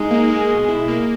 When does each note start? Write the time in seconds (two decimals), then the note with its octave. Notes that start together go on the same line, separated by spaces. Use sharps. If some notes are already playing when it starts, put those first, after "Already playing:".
Already playing: G#3 D#4
0.11 A#3
0.30 G#4
0.50 B2
0.69 E4
0.88 A#3